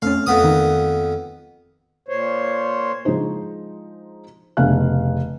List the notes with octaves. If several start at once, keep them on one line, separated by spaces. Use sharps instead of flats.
A3 C4 C#4 F5
F2 B3 D#6
D#3
A#2 C5 C#5
F3 G#3 D4 D#4 C5
F1 C#3 B3 D4 F5 F#6